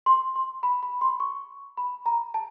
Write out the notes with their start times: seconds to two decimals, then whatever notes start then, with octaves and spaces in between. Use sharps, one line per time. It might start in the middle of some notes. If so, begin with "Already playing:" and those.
0.06 C6
0.36 C6
0.63 B5
0.83 B5
1.01 C6
1.20 C#6
1.77 B5
2.06 A#5
2.34 A5